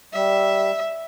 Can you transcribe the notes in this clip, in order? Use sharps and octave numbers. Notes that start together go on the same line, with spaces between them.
G3 E5